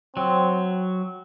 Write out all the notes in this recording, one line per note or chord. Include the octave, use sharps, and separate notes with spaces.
F#3 C4